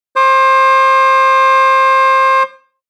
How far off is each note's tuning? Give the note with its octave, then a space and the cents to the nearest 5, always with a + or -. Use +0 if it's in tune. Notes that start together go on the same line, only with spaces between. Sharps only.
C5 +25 D6 +45